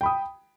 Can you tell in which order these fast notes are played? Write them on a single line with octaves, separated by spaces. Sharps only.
G5 B5 D#6